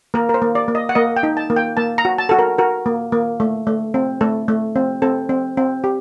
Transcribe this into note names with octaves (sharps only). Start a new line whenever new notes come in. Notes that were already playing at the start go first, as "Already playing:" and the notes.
A#3 A#4
A#4
C5
A#3
D5
A#3
D#5
F#5
A#3 D#5
G5
D#4
A5
A#3
G5
A#3 A5
A#5
F#4
A5
F#4 A4
A#4
F#4 A#4
A#3
A#3
A3
A3
C4
A3 A4
A3
C4
C4 A4
C4
C4
G4